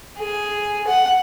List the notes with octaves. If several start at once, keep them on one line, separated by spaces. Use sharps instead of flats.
G#4
F#5